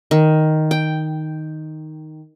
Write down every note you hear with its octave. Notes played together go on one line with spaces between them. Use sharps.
D#3
G5